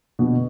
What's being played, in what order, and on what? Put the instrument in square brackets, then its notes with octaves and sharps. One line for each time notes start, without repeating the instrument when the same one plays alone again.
[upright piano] B2 D3